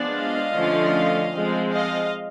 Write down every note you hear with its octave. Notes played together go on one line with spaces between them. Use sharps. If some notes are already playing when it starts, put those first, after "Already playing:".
Already playing: F3 G#3 B3 D4
D#5 F5
D3 F3 A3 C#4
F3 G#3 C4
D#5 F5